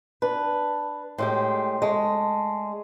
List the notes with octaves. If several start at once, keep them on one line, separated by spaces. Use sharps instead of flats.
D4 B4
A2 G#3 G4 C6
G#3 A3 G#4